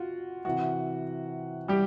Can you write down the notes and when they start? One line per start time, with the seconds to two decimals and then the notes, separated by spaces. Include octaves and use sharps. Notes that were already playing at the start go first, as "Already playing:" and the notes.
Already playing: F4 F#4
0.45 C3 E3 F#4
1.68 G3 G4